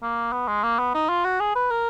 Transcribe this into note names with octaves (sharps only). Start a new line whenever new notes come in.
A#3
B3
G#3
A#3
B3
D#4
F4
F#4
G#4
B4
A#4